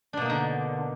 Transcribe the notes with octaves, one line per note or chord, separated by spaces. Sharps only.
B2 D3 A#3 D4 D#4